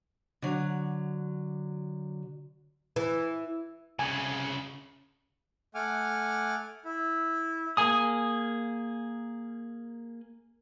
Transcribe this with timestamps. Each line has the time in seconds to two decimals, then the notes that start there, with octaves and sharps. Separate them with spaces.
0.42 D3 F#3
2.96 E3
3.99 C2 C#3 G#5
5.75 A3 F#5 G#5 D6 F6
6.85 E4
7.77 A#3 G#4 G#5 D#6